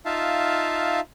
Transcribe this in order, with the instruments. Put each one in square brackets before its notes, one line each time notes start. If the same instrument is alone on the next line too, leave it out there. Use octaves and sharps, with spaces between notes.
[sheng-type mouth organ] D#4 F4 E5 F5 A5